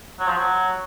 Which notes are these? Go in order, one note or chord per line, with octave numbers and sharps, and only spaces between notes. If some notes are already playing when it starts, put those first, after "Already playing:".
F#3
F3
F#3